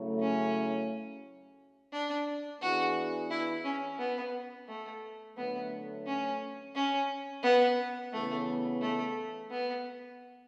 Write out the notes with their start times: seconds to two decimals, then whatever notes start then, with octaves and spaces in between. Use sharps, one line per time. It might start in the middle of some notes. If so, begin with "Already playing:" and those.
Already playing: C#3 F#3 A3 E4
0.20 C#4
1.92 D4
2.61 E3 B3 D4 F#4 G#4
3.30 E4
3.64 C#4
3.99 B3
4.68 A3
5.36 D3 F#3 A3 B3
6.06 C#4
6.75 C#4
7.43 B3
8.12 C#3 E3 A3 B3
8.81 A3
9.51 B3